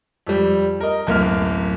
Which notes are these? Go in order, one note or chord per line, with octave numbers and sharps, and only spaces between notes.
F2 G3
A#4 D#5
D1 F#2 A#3 F6